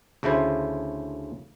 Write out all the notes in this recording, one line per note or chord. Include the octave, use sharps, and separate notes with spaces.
D2 C#3 A3 E4 C5